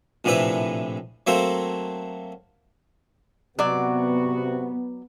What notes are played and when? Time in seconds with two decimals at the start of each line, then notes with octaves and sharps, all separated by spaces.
0.24 A#1 A2 C3 E3 D5 E5
1.27 F#3 A3 A#3 C4 A4 C5
3.59 C3 F#3 B3 F#4 D5